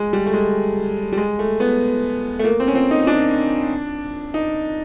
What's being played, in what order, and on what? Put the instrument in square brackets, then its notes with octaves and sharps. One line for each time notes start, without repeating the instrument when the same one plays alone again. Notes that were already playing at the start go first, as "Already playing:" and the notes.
Already playing: [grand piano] G#3
G3
A3
G#3
G3
G#3
A3
B3
A3
A#3
C4
C#4
C4
D#4
D4
D#4